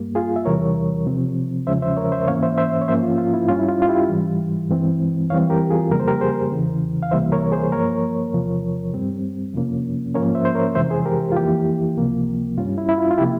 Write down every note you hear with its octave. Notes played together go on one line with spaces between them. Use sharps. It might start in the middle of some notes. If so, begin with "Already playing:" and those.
Already playing: G2 G3 A#3
F4 G#4
E5
E2 C3 E3 G3 A#4 C#5
C3 F3 C4
E2 C#3 F3 G#3 C#4 C5 E5
C5 E5
A#4 C#5
C5 E5
G#2 E3 A#3 C#4 C#5 F5
C5 E5
C5 E5
C#5
G#2 F3 A#3 C#4 C5 E5
F4
F4
E4
G2 G3 C#4 F4
E4
F4
F4
E4 G4
G#2 E3 G3
G2 E3 G#3 C4
F2 E3 G3 C4 C#5 F5
G4 A#4
F4 G#4
F2 C#3 G3 A#3 A#4
C5
G4 A#4
G#4 C5
E2 C#3 E3
F5
C#2 C3 E3 G3 A#3 C5 E5
A#4 C#5
G#4 C5
G2 F3 A#3 A#4 C#5
E2 C3 F3
G2 G3 C4
F2 C3 F3 A#3 C#4
G#2 F3 A#3 C#4 A#4 C#5
C5 E5
C5
A#4 C#5
F2 C3 E3 G#3 C5 E5
G#4 C5
G4 A#4
F4
F2 E3 A#3 E4 G4
C#2 C3 F3 A#3
G2 G3 C#4 F4
E4
E4
F4
F4
C3 F3 A#3 E4 G4